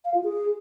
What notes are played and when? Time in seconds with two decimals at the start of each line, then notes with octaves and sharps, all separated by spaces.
0.05 F5
0.14 F4
0.24 G#4